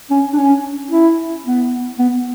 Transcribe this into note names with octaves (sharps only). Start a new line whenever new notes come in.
C#4
D4
C#4
E4
B3
B3